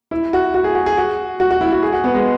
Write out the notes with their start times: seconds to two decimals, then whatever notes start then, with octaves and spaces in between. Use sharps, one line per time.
0.11 E4
0.33 F#4
0.54 F#4
0.64 G#4
0.75 F#4
0.86 G#4
0.97 F#4
1.40 F#4
1.51 F#4
1.61 E4
1.72 F#4
1.83 G#4
1.93 F#4
2.04 B3
2.14 G#3